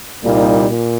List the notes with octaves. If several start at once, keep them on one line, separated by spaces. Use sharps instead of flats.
C2 A#2 G3 A#3 D#4
A#2